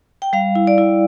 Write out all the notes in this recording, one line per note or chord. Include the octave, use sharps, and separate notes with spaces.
G5
G3 F5
E4
D5
E4